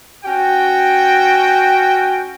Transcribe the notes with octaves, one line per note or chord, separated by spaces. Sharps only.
C#4 F#4 G5